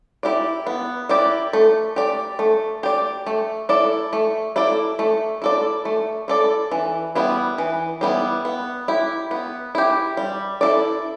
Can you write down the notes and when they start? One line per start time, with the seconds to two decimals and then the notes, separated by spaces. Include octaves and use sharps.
0.23 E4 G4 D5
0.67 B3
1.09 E4 G4 D5
1.53 A3
1.96 G4 D5
2.39 A3
2.83 G4 D5
3.26 A3
3.69 E4 A4 D5
4.13 A3
4.56 E4 A4 D5
4.99 A3
5.42 E4 A4 D5
5.85 A3
6.28 E4 A4 D5
6.71 E3
7.15 G3 B3 E4
7.58 E3
8.01 G3 B3 E4
8.45 B3
8.88 E4 G4
9.31 B3
9.75 E4 G4
10.17 G3
10.61 E4 A4 D5